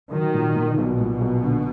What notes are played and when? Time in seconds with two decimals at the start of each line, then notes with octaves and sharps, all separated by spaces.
0.12 D#3 F#3
0.34 A#2
0.56 A#2
0.78 B1 B2
1.00 A#2
1.21 B1
1.44 D3